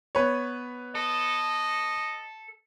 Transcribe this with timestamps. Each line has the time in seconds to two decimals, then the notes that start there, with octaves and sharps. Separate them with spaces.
0.15 B3 B4 C#5
0.95 A4 D#5